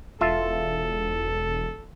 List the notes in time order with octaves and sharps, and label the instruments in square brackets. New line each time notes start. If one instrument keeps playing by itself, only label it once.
[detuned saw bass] E1 [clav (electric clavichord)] F4 E5 A5 [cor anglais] A4